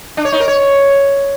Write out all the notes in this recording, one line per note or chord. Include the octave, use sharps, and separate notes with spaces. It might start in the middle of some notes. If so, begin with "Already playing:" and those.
D4
C#5
D#4
A#4
C#5